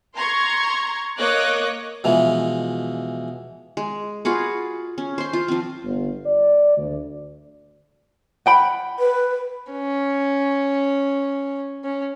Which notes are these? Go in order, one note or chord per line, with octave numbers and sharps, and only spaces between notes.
A#5 C6 C#6 G#6
A#3 C#5 D#5 D6 F#6
B2 E3 F3 G#3
G#3
F4 F#4 G#4 B4
C#4
C5 C6
F4
F3 C4
G1
D5
D2
F#5 G5 B5
B4
C#4
C#4